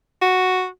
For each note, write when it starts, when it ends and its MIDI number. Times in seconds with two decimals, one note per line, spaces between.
0.22 0.67 66